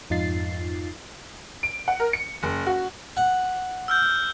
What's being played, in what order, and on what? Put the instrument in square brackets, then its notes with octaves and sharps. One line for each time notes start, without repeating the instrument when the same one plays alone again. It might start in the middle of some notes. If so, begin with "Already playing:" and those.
[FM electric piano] F2 G#2 D#4 F4 A6 C7
[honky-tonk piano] D7
F#5
A#4
C#7
F#1
F#4
[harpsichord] F#5
[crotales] E6 F6 G6